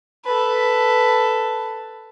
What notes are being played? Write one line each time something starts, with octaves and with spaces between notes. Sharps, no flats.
A4 B4